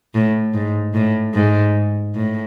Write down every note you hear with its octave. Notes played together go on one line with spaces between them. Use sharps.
A2
G#2
A2
G#2
A2